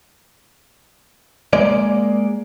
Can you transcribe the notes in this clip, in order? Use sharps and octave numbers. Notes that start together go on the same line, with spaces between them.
G#3 A#3 D5